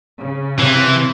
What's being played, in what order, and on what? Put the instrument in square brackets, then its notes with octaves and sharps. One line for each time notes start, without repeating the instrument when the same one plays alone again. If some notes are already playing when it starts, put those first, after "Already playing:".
[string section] C#3
[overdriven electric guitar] C3 [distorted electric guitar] E3